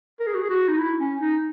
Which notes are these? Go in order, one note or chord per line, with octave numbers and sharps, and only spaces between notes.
A#4
G#4
F#4
G#4
F#4
D#4
E4
C#4
D#4